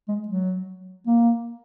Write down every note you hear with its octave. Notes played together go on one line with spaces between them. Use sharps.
G#3
F#3
A#3